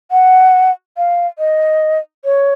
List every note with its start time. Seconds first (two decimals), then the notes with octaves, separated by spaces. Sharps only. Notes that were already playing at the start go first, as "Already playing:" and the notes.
0.11 F#5
0.97 F5
1.39 D#5
2.25 C#5